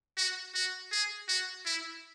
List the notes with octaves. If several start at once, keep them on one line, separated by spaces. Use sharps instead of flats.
F#4
F#4
G#4
F#4
E4